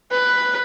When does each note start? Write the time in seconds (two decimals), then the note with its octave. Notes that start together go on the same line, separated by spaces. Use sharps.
0.11 B4